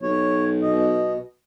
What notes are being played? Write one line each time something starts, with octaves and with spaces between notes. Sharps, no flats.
B1 C#5
B2 D#5